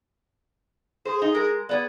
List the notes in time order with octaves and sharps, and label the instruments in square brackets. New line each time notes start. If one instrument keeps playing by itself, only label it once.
[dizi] G#4 [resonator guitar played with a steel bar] C5
[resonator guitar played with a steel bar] D#4
G#3 A#4
[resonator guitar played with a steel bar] B3 G#4 [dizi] D5